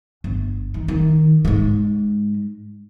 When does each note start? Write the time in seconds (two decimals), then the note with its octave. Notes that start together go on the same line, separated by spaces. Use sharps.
0.24 G1
0.74 D#3
0.88 D#3
1.45 G#2 G#3